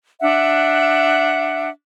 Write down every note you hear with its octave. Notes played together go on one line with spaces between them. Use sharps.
D4 E5 F#5